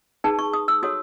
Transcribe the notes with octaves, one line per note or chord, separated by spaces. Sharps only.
D#4 G#4 B4 A5
C#6
D#6
E6
F#4 A4 C#5 D#6